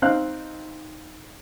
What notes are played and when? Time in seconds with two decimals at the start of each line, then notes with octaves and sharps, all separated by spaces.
0.02 C4 D#4 F5 F#6